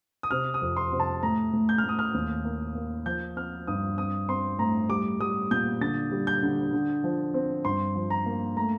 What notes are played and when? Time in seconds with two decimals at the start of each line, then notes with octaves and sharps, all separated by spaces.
0.23 D#6
0.31 C3 F6
0.54 D#6
0.62 F2
0.77 C6
0.92 C3
1.00 A5
1.23 A2 A#5
1.53 A2
1.69 G6
1.78 F6
1.84 A2 D#6
1.99 F6
2.14 D#2
2.45 A#3
2.75 A#3
3.06 F3 G6
3.36 C4 F6
3.67 G2 D#6
3.98 C4 D#6
4.29 C4 C6
4.59 A2 A#5
4.90 G3 D6
5.20 G3 D#6
5.51 A#2 G6
5.81 D3 A6
6.12 G3
6.27 G6
6.43 D3
6.73 D3
7.04 F3
7.34 C4
7.65 G2 C6
7.96 F3
8.10 A#5
8.26 A#3
8.57 A3 A#5